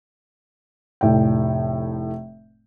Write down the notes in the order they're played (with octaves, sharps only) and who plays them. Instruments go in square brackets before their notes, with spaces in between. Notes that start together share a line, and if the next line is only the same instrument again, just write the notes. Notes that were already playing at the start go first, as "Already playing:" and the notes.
[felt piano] F1 A2 G5